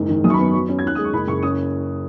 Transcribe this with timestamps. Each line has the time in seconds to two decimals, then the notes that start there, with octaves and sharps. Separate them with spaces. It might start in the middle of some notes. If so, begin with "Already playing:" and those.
Already playing: F#1 G#2
0.09 D#3
0.24 F#2 D#6
0.30 C#6
0.34 B5
0.39 B3
0.54 F#3
0.69 C#4
0.79 G#6
0.83 D#2 F#6
0.95 G#3 D#6
1.04 C#6
1.13 F#1 B5
1.28 F#1 C#6
1.43 C#4 D#6